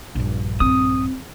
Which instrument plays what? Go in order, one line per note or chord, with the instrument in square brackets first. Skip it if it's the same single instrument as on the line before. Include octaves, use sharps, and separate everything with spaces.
[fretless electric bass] A#1 G2
[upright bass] C4 [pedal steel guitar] D#6